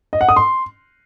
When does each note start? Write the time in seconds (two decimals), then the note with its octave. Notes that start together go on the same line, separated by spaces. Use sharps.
0.13 D#5
0.21 F#5
0.29 D#6
0.36 C6